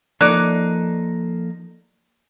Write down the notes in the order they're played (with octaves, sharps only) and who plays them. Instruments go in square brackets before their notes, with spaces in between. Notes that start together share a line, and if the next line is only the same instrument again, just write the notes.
[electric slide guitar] F3 A#3 A4 [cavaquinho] D#4 D6 [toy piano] D5 [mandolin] F#6